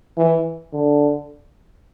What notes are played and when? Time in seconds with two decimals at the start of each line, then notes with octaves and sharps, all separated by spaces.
0.18 E3
0.73 D3